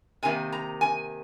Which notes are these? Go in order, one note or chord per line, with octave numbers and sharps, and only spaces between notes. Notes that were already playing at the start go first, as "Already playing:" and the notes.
C3 D#3 A#3 G#5
A#5
G#5